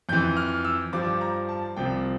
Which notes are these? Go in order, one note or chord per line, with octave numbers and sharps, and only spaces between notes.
F2 E3 G6
F6
E6
G2 F3 D6
A#5
A5
C2 C3 F3 G5